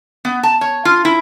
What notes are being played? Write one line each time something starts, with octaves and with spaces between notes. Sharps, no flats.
B3
A5
C#5
F4
E4